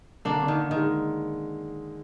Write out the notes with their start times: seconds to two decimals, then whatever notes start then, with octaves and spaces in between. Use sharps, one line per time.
0.25 D3 A#3 D4
0.42 D3
0.48 D#3
0.60 D#4
0.71 D#3
0.76 G#3